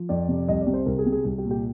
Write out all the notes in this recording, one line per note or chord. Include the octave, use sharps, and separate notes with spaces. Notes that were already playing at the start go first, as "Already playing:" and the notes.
Already playing: F3
F2 D5
C3
C2 D#5
D5
C3
C5
C2 A#4
G#4
C3
G#4
C2
G4
A#2
G4